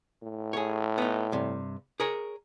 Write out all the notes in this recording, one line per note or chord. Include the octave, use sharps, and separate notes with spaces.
A2
G#4 C#5
B3 D#4
G2 C3
G#4 A#4 C#5